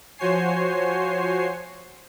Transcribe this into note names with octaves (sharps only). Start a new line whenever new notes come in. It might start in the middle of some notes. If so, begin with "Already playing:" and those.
F3 F#4 C5 C#5 G#5 C7